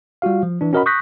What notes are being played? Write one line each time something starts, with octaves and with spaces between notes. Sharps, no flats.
G3 F4 F#4 F5
F3
E3 D4
C#4 F#4 A#4 D#5 F#5 B5
C#6 D#6 F#6 G6 A#6 B6